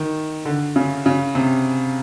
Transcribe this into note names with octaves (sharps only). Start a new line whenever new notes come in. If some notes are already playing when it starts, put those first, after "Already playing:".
Already playing: D#3
D3
C#3
C#3
C3